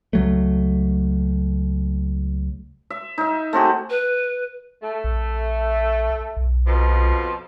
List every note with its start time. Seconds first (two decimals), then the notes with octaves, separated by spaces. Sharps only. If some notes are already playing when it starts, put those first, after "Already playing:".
0.13 C#2 F#3 A3
2.90 E5
3.18 D#4 E5
3.53 A3 C4 F#4 G#4
3.90 B4
4.82 A3
5.04 A#1
6.37 B1
6.67 F2 B2 F3